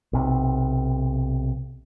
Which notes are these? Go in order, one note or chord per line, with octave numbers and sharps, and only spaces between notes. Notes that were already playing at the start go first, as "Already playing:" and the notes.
B1 C3